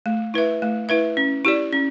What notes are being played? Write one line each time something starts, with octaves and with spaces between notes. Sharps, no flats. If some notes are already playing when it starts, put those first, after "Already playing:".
A3
E4 B4 E5
A3
E4 B4 E5
C#4
E4 G4 D5
C#4